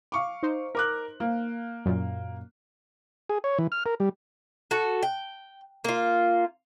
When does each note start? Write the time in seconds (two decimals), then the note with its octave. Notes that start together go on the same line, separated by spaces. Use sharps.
0.12 F5 C#6 D6
0.43 D#4 C5
0.75 A#4 D6 F#6
1.20 A#3
1.86 F#2 A#2
3.29 G#4
3.44 C#5
3.58 E3
3.72 F6
3.86 A#4
4.00 G3
4.71 F#4 A4
5.03 G5
5.84 A#3 F4